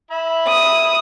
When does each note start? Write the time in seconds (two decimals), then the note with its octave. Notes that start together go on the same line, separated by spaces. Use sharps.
0.11 E4 E5 B5
0.48 D#6